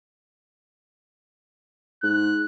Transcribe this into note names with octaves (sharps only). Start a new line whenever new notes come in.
G#2 F#6